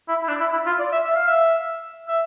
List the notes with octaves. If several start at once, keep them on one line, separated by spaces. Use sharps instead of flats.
E4
E4
D4
E4
E4
F4
D5
E5
E5
F5
E5
E5